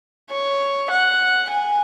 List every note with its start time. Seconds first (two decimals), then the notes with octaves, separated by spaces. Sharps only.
0.30 C#5
0.90 F#5
1.50 G#5